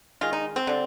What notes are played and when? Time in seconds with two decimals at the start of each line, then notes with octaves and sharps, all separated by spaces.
0.21 D#3 G#3 F4
0.33 D#4
0.56 C4
0.67 D3 G3